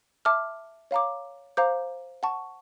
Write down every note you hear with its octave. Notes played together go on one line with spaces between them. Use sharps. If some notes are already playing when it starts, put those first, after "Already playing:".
E5 A5 D6 F6
C#5 F5 A#5 D6
C5 F5 A#5 D6 G6
F#5 A5 C#6